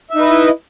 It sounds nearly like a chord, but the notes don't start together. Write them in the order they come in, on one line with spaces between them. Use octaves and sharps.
E5 D#4 B4 D#5 E4